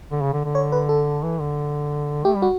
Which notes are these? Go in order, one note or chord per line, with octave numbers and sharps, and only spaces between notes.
D3
C#3
D3
D3
C#5
B4
A4
E3
D3
A3 G4
G3
F#4